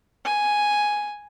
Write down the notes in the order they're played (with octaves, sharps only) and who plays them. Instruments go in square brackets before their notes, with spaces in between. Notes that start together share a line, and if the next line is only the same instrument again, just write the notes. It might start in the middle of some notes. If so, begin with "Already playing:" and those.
[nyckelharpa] G#5